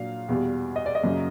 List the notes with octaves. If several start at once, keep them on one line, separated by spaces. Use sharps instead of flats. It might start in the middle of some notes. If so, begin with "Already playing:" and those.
Already playing: A#2 F#3 D4 F5
E2 B2 G3
D#5
D5
D#5
F#2 C#3 F#3 A#3